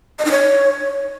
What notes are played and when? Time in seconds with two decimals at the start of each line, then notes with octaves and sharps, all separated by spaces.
0.19 D#5
0.25 D#4
0.31 C#5